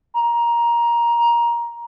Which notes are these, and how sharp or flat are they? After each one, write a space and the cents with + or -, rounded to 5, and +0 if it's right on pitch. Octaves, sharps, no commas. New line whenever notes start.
A#5 +15